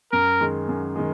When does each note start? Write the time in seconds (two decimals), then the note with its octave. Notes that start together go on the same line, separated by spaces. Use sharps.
0.12 F#2 A#4
0.41 D#3 G#3
0.69 F#2
0.96 D#3 G#3